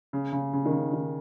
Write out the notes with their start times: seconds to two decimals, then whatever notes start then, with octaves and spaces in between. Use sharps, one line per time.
0.13 C#3
0.32 C#3
0.53 C#3
0.65 D#3
0.72 C#3
0.93 D#3